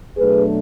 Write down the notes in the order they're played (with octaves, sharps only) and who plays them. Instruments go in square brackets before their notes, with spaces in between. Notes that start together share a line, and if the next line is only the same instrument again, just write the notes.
[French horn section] B2 F#3 A3 D4 G#4 B4